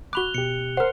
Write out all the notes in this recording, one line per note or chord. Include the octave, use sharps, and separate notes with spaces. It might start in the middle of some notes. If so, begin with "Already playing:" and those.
F#4 B5 D6 F#6 F7 G7
B2 G4 C#7
A#4 C5 F#5